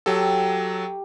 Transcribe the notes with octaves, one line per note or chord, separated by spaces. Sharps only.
F#3 G4 A4